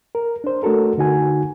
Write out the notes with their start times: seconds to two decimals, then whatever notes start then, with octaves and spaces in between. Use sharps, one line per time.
0.15 A#4
0.44 D4 C5
0.63 A3 D4 F#4 A4 A#4
0.98 D3 D#4 F#4 G#5